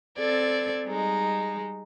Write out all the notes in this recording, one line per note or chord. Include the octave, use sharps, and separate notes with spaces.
C4 A4 D5 G#6
G3 G#3 D#4